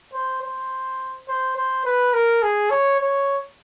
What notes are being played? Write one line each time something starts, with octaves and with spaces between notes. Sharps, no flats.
C5
C5
C5
C5
B4
A#4
G#4
C#5
C#5